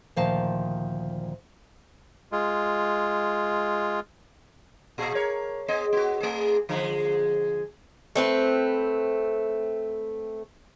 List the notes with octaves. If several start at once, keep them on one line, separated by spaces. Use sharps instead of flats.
D2 A#2 D#3 F3 F5 A5
G#3 F4
A#2 G#4
A#4 C#5
B3 G#4 D#5
B3 F#4
A3 G#4
D3 F3 G#3
A3 C4 B4